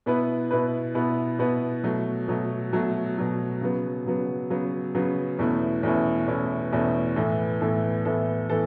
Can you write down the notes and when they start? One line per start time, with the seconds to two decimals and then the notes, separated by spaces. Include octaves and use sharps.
0.06 B2 B3 E4 B4
0.51 B2 B3 E4 B4
0.95 B2 B3 E4 B4
1.39 B2 B3 E4 B4
1.84 B2 F#3 A3
2.28 B2 F#3 A3
2.72 B2 F#3 A3
3.17 B2 F#3 A3
3.61 C#3 F#3 B3
4.06 C#3 F#3 B3
4.50 C#3 F#3 B3
4.95 C#3 F#3 B3
5.39 E2 B2 A3 C#4 E4
5.83 E2 B2 A3 C#4 E4
6.28 E2 B2 A3 C#4 E4
6.72 E2 B2 A3 C#4 E4
7.16 A2 E3 B3 A4
7.61 A2 E3 B3 A4
8.05 A2 E3 B3 A4
8.49 A2 E3 B3 A4